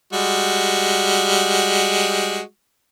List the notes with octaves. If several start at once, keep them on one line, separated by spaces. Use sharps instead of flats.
G3 G#3 F#4